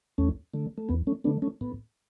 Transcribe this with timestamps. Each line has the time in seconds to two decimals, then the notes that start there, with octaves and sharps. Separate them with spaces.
0.18 E2 A3 C#4
0.53 D3 A3
0.78 A3
0.89 E2 B3
1.07 A3 C#4
1.24 D3 A3 B3 D4
1.42 A3 C#4
1.61 A2 B3